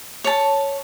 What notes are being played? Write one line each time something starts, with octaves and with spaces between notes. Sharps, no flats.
C#5 A5